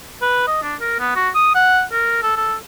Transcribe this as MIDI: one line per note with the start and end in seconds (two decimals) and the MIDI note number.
0.22 0.46 71
0.47 0.59 75
0.62 0.75 62
0.81 0.97 70
0.99 1.14 59
1.16 1.29 66
1.35 1.50 87
1.55 1.82 78
1.92 2.18 70
2.23 2.36 69
2.37 2.55 69